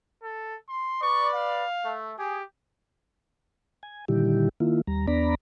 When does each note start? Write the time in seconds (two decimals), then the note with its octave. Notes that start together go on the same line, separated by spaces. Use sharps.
0.23 A4
0.69 C6
1.02 B4 D5 C#6
1.35 F5
1.85 A3
2.19 G4 G#4
3.83 G#5
4.08 A#2 D3 D#3 G3 E4 G4
4.60 D#3 A#3 E4 F4
4.87 D#2 G3 A#5
5.07 E2 B3 D4 D5 A#5 B5